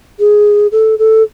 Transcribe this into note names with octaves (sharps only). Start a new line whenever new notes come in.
G#4
A4
A4